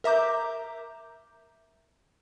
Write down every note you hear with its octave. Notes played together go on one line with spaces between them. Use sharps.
A#4 E5 A#5 D6 G6